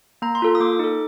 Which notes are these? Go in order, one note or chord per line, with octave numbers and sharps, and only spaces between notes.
A#3 A#5
C6
F4 A4
D#6
A#3 D6
D#4 A4